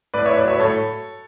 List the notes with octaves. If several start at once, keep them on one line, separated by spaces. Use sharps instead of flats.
A2 B4 D5
C#5 E5
A2
B4 D5
F#3 C#5 E5
A2 A4 C#5